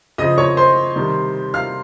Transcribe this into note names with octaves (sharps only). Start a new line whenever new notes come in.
C#3 F3 C4 D#5 D#6
C#5 C#6
C5 C6
C3 D#3 G3
F5 F6